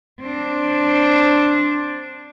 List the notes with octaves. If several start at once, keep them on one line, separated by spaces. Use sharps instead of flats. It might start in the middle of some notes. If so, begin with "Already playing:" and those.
C4 D4